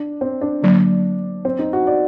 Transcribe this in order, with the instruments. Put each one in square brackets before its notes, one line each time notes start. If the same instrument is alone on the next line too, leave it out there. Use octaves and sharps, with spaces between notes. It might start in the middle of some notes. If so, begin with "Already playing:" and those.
Already playing: [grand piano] D4
C4
D4
[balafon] D3 F#3 A#3
[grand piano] C4
D#4
F#4
D5